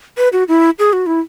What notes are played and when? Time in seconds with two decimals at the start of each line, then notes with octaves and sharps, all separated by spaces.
0.17 B4
0.33 F#4
0.48 E4
0.79 G#4
0.93 F#4
1.06 E4